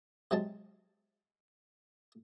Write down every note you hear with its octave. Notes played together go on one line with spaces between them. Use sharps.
C3 F#3 G#3 A5